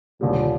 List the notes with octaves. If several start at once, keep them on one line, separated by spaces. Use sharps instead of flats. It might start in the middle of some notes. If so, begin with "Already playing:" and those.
D#2 A#2 D3 G3